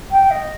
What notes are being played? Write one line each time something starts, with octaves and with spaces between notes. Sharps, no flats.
G5
D#5